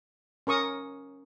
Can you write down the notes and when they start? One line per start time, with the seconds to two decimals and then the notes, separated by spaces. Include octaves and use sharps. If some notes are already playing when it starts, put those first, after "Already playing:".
0.47 C#4 A#4 C#6 D#6